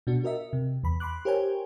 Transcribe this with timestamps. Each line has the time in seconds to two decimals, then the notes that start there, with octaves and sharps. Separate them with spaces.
0.07 B2 D4 F#4
0.24 F#4 A#4 D#5 E5
0.53 C3
0.83 E2 B5
1.00 B5 C6 D6 F#6
1.25 G4 A#4 C5 C#5 G5 G#5